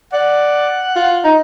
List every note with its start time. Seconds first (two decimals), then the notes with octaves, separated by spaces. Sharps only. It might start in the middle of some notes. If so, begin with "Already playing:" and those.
0.13 D5 F#5
0.96 F4
1.24 D#4